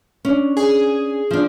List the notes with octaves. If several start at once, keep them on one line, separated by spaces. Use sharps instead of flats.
C#4 D4
G#4
F3 D4